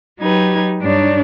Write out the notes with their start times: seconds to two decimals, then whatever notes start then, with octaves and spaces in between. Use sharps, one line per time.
0.20 F#3 D#4 G4 B4 G#6
0.81 G2 D4 D#4 C#5 D5